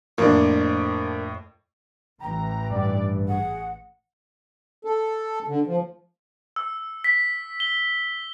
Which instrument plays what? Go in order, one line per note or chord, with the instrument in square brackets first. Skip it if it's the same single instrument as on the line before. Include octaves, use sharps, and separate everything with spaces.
[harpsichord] F2 [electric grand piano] A2 [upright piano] A#3 D4
[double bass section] A1 E3 [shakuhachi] G5 [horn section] A#5
[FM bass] G2 [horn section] D5
[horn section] G#4 [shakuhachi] F#5
[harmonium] A4
D3
F3
[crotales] E6
B6
G7